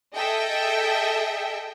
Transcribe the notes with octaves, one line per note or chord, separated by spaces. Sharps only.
G#4 A4 D#5 E5 G5